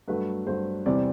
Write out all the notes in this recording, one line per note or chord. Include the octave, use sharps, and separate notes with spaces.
G2 F#3 A3 B4
G2 F#3 A3 C5
E2 C3 E3 G3 C4 D5